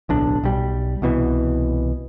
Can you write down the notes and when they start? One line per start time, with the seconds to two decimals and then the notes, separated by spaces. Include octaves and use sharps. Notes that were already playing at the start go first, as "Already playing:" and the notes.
0.09 D1 B1 D4
0.44 B1 G3
1.02 C2 B2 E3